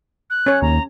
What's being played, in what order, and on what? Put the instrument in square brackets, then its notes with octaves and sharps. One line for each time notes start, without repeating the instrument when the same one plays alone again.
[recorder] F#6
[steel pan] C#4 C#5
[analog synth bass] D#2 [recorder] A#5